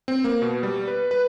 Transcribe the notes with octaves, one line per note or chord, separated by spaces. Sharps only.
C4
A#3
B2
G3
B4
B4